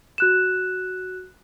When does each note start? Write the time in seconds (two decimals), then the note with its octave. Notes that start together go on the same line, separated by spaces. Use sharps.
0.18 F#4 F#6 E7